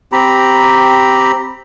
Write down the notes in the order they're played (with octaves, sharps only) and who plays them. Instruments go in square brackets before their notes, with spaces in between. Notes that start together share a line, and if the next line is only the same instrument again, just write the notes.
[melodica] C4 G4 A#5 B5